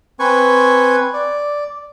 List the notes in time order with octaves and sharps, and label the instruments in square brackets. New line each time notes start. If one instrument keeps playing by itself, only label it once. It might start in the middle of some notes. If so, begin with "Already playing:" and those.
[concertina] C4 B4 G#5 C#6
D5